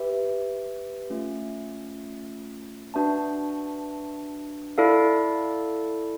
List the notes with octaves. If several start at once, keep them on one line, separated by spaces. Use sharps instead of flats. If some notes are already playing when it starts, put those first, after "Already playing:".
Already playing: G4 B4 E5
A3 C#4 F4
D4 F#4 B4 E5 A5
E4 A4 D5 F5